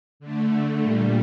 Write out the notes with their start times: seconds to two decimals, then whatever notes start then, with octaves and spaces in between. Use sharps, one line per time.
0.20 D3 A3
0.82 A#2 G3